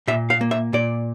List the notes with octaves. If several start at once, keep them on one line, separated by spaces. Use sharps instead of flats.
A#2 E5
F5
A#3
E5
A#2 D5